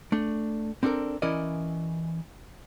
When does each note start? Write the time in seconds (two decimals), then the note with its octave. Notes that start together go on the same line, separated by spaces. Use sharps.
0.12 A3 D4
0.83 C4 D4 F#4 A4 A#4
1.22 E3 C#4 E4 A#4 D5 D#5